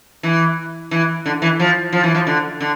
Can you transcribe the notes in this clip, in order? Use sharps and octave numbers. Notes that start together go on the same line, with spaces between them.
E3
E3
D3
E3
F3
F3
E3
F3
D3
D3